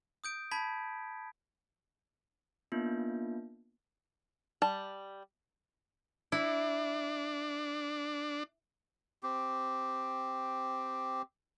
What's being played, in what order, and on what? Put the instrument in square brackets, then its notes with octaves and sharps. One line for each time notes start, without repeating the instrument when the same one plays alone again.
[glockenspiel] D#6 G6 D7
A5 B5 G#6 B6
[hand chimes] A#3 B3 D4 D#4 F4
[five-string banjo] G3 A5
[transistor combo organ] D4 [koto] E4
[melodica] C4 G4